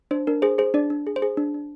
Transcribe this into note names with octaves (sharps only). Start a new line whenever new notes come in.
D4 C5
D4 A#4
G#4 C5
G#4 C5
D4 D5
D4
G#4
C5
G#4
D4
D4